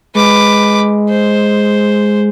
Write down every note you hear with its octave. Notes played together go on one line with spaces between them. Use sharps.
G#3 B4 D6
C5